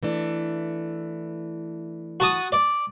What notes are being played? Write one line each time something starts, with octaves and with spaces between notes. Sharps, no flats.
E3 A3 D4
F#4 A5 D#6
D5